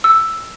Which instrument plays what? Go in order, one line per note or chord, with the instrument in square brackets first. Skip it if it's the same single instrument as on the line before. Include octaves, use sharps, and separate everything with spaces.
[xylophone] E6